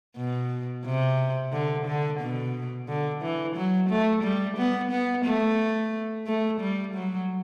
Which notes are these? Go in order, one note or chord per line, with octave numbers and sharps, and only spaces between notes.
B2
C3
D3
D3
B2
D3
E3
F#3
A3
G3
B3
B3
A3
A3
G3
F#3